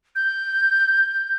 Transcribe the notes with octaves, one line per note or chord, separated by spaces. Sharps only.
G6